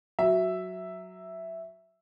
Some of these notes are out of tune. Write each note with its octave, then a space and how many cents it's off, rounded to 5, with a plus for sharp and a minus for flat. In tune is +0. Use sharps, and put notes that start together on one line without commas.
F#3 +0 E5 +0